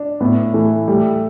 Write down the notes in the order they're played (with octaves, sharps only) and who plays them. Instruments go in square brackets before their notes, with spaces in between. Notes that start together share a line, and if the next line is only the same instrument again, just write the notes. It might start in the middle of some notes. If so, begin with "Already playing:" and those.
Already playing: [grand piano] D4
[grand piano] A2 [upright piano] B3
[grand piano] E3 [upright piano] A3
[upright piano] G3 [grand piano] A3